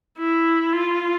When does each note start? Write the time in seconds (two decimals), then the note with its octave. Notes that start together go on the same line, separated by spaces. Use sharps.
0.18 E4
0.72 F4